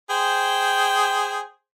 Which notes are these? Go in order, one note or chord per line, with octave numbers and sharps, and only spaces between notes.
G#4 C5 G5